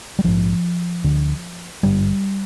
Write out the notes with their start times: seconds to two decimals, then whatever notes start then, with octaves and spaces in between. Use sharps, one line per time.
0.19 G3
0.24 A#1 G#2 F3
1.04 D2 D3
1.83 G#1 G2 D3 G3